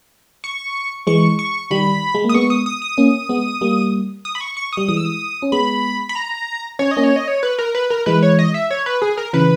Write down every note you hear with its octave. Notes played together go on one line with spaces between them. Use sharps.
C#6
E3 G#3 C#6
C#6
D#3 G3 B5
G#3
A#3
D#6
G#3 B3 C#6
D#6
D#6
D#6
A#3 C#4
G#3 B3
G3 A#3
D#6
B5
C#6
C#6
G3 D#6
E3 G#3 D#6
E6
D#6
C#4
G#3 B3 B5
B5
A#5
C#4 C#5
D#5
A#3 C#4
C#5
D#5
C#5
B4
A#4
B4
A#4
E3 G#3 B4
C#5
D#5
E5
C#5
B4
G#4
A#4
C#3 E3 B4